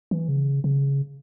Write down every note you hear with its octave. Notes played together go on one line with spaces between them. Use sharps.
E3
C#3
C#3